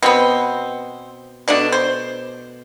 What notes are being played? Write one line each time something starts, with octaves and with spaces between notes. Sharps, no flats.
B2 B3 C4
B2 A3 D4
C5